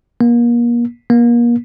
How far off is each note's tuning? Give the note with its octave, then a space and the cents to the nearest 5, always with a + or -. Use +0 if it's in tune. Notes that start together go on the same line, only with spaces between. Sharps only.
A#3 +35
A#3 +35